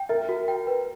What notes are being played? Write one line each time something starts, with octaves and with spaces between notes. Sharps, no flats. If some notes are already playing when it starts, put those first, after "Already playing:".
Already playing: G5
A#4 E5
F#4
G5
B4